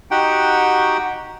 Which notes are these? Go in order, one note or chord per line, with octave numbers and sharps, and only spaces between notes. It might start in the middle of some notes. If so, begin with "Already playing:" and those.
D#4 F#4 G4 F#5 G5